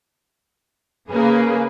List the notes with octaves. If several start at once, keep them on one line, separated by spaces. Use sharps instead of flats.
C#3 A#3 G#4 B4